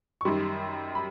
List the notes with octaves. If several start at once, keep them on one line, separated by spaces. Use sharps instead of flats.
C#6
F#2 D#3 G3 C6
B5